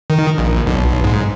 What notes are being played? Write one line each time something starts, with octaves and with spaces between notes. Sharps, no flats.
D#3
A#1
B1
G#2